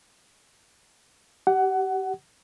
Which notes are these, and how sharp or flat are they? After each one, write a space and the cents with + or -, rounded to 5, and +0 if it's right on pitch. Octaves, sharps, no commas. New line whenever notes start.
G4 -25 F#5 +20